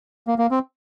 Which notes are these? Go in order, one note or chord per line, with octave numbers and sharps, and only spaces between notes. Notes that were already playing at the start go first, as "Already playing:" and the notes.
A#3
A#3
C4